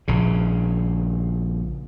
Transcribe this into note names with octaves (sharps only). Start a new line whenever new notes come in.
A#1 C#3